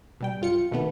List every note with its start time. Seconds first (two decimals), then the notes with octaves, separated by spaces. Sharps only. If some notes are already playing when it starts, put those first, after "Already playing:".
0.20 B2 G3 G5
0.41 F#2 F4 C#7
0.71 B1 B2 D#3 A3 B3